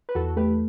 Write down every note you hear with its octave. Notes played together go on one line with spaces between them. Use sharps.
B4
E2 F#4 A4
A3 G4 B4